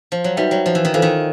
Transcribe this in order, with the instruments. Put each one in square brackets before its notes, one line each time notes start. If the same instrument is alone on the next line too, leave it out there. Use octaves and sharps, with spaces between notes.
[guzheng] F3
F#3
[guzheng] G3 [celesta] D#4 F#4 B4 E5 G5
[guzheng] F#3
F3
E3
D#3
[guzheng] E3 [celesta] F4 A4 C5 F5
[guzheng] D#3